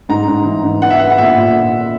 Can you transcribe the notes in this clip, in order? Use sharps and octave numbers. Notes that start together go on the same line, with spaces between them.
G#2 A#5
G#2
E3
G#2
B3 F#5
E5
B3 F#5
F#5
A#2 E5
A#2